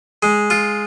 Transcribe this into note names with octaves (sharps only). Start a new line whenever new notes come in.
G#3
F4